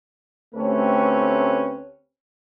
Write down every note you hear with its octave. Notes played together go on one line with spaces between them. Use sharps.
D2 A3 C4 C#4 G4 B4